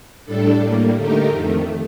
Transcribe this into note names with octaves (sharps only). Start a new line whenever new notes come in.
A2 G3 D4 A4
A2 G3 A#3
D3 A3 D#4 G4 A#4
F2 D#3 A3